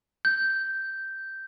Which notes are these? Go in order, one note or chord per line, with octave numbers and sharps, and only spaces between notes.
G6